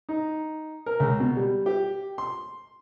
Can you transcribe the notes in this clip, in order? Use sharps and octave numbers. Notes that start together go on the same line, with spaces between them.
D#4
A#4
C#2
B2
G3
G4
C6